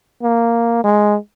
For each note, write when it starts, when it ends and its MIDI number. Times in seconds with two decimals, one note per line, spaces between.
0.23 0.80 58
0.84 1.16 56